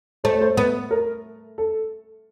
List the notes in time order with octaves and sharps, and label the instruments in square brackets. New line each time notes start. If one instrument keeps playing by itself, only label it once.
[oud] A3 [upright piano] C5
[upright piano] C#5
C5
[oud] B3 [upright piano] B4
[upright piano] A#4
A4